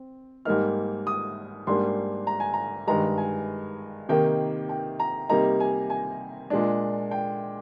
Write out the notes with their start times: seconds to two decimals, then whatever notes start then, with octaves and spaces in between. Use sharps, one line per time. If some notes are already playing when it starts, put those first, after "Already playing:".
Already playing: C4
0.45 G#2 G3 A#3 D#4 F6
1.07 D#6
1.67 G#2 G3 A#3 D4 C6
2.27 A#5
2.40 G#5
2.54 A#5
2.87 G2 D#3 G#3 A#5
3.18 G#5
4.09 C3 D#3 A#3 D#4 G5
4.69 G5
5.00 A#5
5.29 C3 G3 A#3 D#4 A#5
5.60 G#5
5.90 G#5
6.50 A#2 G#3 D4
7.11 G5